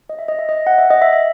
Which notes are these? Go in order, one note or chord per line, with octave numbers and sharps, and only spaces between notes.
D#5
E5
D#5
E5
D#5
F#5
E5
D#5
E5
E5